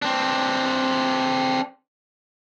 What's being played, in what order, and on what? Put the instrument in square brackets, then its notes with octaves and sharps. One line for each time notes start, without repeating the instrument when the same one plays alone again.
[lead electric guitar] C4 D4